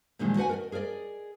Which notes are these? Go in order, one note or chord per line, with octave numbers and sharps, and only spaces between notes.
A#2 D3 D#3 F3 G3 G#3
F#4 B4 F#5 G#5
A#4 D5 D#5
G#4 A#4 C5 D5 D#5